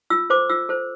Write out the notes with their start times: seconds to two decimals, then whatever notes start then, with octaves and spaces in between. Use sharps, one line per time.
0.10 F4 E6
0.30 A4 C5 D6
0.49 F4 E6
0.69 A4 C5